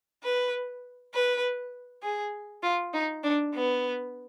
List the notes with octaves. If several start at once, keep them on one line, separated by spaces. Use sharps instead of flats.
B4
B4
G#4
F4
D#4
D4
B3